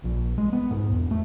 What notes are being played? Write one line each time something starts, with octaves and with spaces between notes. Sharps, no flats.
A#1
G#3
B3
G#2
E1
A3